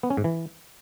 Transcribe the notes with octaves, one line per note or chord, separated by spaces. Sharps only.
B3
C#4
G#2
E3